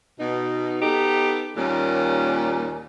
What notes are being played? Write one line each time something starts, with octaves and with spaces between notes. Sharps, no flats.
B2 D#4
B3 D#4 G4 A4
D#2 A#2 G3 C#4